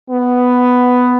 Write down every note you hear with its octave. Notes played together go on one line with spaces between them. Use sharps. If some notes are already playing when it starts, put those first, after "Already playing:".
B3